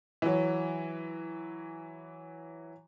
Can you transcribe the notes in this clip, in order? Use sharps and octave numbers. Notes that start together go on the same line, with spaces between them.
E3 F#3